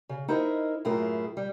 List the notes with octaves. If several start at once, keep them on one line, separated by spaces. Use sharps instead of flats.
C#3
D#4 E4 A#4 C5 D#5 E5
F#2 A2 E4 F4 G#4 A#4
G3